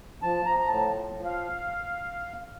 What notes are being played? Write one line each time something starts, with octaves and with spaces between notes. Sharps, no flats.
F3 A5
F3 A#5
A#5
A2 A5
F3
F3
F5